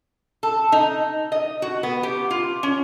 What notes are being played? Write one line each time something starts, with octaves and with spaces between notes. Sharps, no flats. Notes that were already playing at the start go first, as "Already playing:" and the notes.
A4
D#4
D#5
F#4
B3
G4
F4
C#4